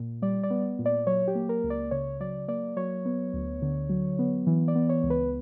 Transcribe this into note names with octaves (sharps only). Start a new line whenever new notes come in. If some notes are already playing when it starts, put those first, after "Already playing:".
Already playing: A#2
G3 D5
D5
B3
A#2
D5
F#3 C#5
G4
A#3
A#4
C#2
D5
C#3 C#5
F#3 D5
A#3 D5
F#3 C#5
B3
D2
D3
F#3
B3
E3
D5
B3
C#5
C#2
B4